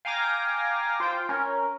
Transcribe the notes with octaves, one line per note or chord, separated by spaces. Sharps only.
F5 G5 G#5 A#5 D6 A#6
F4 C5 G5
C#4 A#4